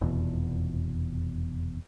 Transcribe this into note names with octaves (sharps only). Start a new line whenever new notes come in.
F1 E2 B2